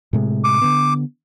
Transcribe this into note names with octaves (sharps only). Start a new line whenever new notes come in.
A2 C3 G#3
D6
D3 B3